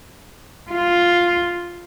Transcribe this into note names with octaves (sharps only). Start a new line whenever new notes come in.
F4